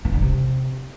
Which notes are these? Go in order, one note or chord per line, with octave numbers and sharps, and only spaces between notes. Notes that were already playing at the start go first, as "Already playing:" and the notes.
E3
D3
C3